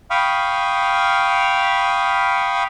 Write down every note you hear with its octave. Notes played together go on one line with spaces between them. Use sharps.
F5 G5 B5 C#6 D#6 F6